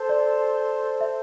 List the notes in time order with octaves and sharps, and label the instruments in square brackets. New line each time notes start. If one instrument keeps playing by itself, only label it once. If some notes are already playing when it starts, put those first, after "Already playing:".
Already playing: [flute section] A4 C5 A5 C6
[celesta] D5
E5